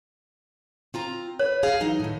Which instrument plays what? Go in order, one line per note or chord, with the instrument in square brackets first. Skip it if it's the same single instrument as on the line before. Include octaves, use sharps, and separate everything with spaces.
[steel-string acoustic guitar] C4 F4 A#5
[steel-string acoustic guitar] B4 [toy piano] C#5
[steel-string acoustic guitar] G#4 F5
E3 F#3 D#4
A2 D#3